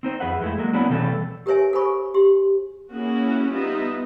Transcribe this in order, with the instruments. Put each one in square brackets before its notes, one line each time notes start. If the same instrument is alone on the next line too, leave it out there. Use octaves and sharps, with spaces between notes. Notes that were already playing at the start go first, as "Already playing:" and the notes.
[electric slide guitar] C4 D#4 C5
F2 G#4 B4 E5 F#5
F2 G#3 A3 E4
F#3 G#3 A#3
A#3 B3 C#4 D4 E4 F#4
B2 E3 G3 A3 C4 A4
[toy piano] G4 A#4 B4 C#5 E5 G#5
A4 A#4 C5 G#5 B5 C#6
G4 C6
[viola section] A#3 C#4 E4 F#4 G#4
G3 B3 D#4 F4 D#5 E5